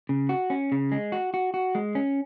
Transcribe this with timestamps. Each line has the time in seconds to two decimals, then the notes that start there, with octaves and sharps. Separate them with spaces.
0.09 C#3
0.29 F#4
0.50 C#4
0.72 C#3
0.92 G#3
1.12 F#4
1.34 F#4
1.54 F#4
1.75 G#3
1.95 C#4